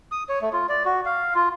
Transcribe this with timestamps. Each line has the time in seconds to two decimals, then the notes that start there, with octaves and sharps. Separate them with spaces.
0.12 D#6
0.29 C#5
0.42 A3
0.53 F4
0.69 D5
0.85 F#4
1.05 F5
1.35 F4